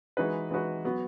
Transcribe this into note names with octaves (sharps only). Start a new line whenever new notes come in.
E3 G#3 D#4 F#4 B4
E3 G#3 D#4 F#4 B4
F#3 B3 F#4